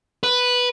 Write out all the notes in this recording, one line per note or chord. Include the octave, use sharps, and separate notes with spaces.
B4